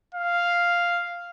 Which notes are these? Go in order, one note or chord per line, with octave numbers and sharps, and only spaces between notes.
F5